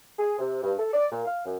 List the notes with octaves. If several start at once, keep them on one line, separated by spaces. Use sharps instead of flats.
G#4
C3
G2
A4
D5
A#2
F5
F#2